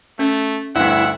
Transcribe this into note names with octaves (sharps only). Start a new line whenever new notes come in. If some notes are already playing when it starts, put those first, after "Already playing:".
A3 C#4
D2 G2 E4 F#5